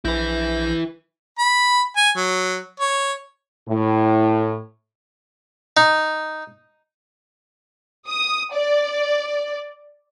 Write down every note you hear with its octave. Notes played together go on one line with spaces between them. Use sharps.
A#1 E4 B4 G6 A#6
B5
G#5
F#3
C#5
A2
D#4
D#6
D5